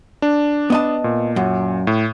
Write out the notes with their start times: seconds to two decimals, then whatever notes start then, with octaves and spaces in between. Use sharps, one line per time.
0.22 D4
0.70 B3 D#5 A5
1.04 A#2
1.36 F#2
1.87 A2